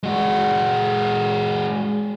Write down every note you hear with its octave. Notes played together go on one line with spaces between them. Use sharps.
G#3 F#4